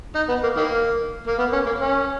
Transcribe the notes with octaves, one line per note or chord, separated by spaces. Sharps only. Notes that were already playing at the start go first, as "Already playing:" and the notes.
D#4
B3
A#3
D#3 A#3
A#3
B3
C#4
A#3
C#4